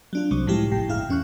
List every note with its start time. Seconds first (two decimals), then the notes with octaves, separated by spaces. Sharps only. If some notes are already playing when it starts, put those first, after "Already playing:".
0.13 F#3 D4 F4
0.31 C2 C3 F#3
0.47 A2 F3 G#3 E4 G4
0.71 G#1 A2 G5
0.89 G1 D2 E4 G#4 F5 F6
1.09 E2 C#4 C#6 F#6